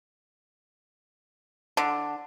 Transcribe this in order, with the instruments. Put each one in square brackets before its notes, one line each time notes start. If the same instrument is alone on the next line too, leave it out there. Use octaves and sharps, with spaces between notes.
[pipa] D3